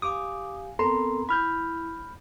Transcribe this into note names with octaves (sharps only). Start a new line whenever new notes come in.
G4 F5 G#5 D6 D#6
B3 C4 A4 A#4 A#5 C6
E4 B5 F6 G6